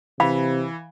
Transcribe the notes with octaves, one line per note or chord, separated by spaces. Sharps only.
C3 E3 F5 B5